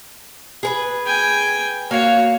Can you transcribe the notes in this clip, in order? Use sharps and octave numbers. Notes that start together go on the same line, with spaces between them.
G#4 A#4 B4
G5 G#5
A#3 F#4 C#5 F5